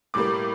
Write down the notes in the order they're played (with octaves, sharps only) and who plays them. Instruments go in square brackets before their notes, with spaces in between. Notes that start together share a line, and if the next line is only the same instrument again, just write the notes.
[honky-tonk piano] A2 G3 A#3 D6